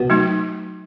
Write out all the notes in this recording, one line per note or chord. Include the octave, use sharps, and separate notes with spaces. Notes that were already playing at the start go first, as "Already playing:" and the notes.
Already playing: B2
F#3 A3 D#4